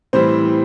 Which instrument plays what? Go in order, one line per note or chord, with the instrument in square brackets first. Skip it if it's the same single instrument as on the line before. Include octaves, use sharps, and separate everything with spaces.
[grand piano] A2 E3 G3 C4 C5